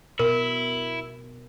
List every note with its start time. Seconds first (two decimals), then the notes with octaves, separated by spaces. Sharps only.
0.19 B2 E4 A#4